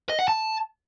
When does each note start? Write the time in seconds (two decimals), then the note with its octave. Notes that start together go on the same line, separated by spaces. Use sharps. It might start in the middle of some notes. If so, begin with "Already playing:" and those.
0.10 D#5
0.19 F#5
0.28 A5